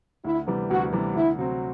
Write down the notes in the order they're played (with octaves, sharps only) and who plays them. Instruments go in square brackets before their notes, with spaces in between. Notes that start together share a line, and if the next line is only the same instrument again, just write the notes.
[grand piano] D2 [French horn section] E4
[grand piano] C3 E3 G3 B3
[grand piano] D2 [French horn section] F#4
[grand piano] C3 E3 G3 B3
[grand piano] D2 [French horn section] E4
[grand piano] C3 F#3 C4 F#4